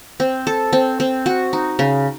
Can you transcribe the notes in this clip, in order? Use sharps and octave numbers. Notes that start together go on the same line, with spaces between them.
C4
A4
C4
C4
F#4
D#4
C#3